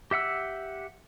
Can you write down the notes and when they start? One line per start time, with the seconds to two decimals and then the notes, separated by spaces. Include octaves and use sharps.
0.11 G4 E5 F#5 E6